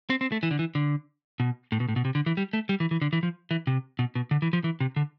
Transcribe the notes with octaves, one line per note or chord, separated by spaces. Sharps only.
C4
C4
A3
E3
D3
E3
D3
B2
A2
B2
A2
B2
C3
D3
E3
G3
A3
G3
E3
E3
D3
E3
F3
E3
C3
B2
B2
D3
E3
F3
E3
C3
D3